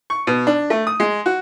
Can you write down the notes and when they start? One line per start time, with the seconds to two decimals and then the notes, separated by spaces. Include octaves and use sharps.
0.10 C#6
0.27 B2
0.47 D4
0.70 A3
0.87 D#6
1.00 G#3
1.26 F#4